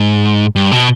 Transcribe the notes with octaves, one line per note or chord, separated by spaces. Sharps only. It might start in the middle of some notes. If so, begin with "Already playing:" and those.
Already playing: G#2
G2
B2